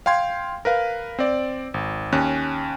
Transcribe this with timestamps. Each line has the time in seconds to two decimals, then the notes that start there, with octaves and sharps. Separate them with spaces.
0.06 F5 G5 C6 G#6
0.65 A#4 B4 F5
1.19 C4 D5
1.74 G#1
2.12 D#2 C#4 F#6